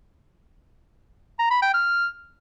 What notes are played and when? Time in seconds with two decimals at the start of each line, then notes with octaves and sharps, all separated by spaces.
1.39 A#5
1.51 B5
1.62 G5
1.74 F6